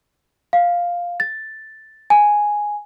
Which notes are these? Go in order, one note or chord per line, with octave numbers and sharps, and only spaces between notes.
F5
A6
G#5